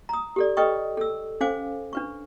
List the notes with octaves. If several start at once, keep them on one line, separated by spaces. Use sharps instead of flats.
A#5 D#6
G4 A4 D5
A4 B4 D#5 G5 C#6 D#6
A4 E6
C#4 A4 C5 F5 G#5 D6
D4 B4 C#6